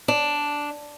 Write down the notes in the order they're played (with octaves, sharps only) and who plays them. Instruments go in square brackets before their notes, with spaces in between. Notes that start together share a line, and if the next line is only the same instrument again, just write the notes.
[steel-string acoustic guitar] D4